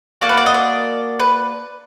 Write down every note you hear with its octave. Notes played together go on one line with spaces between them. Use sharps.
A#3 D4 F#4 D5
B4
D5
D#5
D5
B4